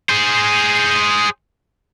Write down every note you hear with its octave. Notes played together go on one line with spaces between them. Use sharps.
G#4 C5